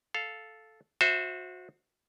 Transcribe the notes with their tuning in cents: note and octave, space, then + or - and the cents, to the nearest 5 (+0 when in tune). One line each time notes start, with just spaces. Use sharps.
A4 -5 F5 +0
F#4 -25 C5 +0 E5 +0